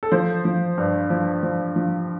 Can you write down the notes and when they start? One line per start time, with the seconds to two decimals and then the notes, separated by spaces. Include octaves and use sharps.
0.03 A4
0.12 F3 C5
0.45 F3
0.78 G2
1.10 F3
1.43 F3
1.76 F3